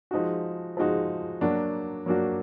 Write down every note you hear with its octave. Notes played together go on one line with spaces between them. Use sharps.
F3 G#3 D#4 F#4
F3 G#3 D#4 F#4
F#3 A#3 D4 F#4
F#3 A#3 D4 F#4